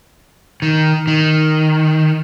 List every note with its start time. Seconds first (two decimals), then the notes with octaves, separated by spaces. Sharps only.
0.62 D#3
1.07 D#3